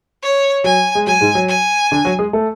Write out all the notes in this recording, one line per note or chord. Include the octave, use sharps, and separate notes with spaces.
C#5
F#3 G#5
G#3
F#3 G#5
G#2 G#3
F#3
G#5
D3 D4
F#3 F#4
G#3 G#4
A3 A4